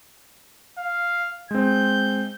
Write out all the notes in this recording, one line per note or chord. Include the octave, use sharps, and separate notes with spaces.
F5
G#3 C4 G6